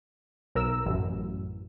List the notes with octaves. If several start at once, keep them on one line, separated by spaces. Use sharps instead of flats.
B1 A#4 E6
A1 F#2